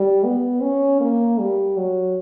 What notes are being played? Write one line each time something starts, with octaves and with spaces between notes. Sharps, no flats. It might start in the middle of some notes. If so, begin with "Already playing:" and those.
Already playing: G3
B3
C#4
A#3
G3
F#3